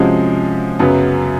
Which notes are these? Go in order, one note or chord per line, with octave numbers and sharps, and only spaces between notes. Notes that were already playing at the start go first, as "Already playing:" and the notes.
Already playing: C3 F3 G#3 C#4 F#4
F#2 C#3 F#3 B3